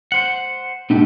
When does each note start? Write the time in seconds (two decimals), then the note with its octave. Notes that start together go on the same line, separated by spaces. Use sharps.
0.12 C5 F#5
0.90 G#2 B2 A3 G4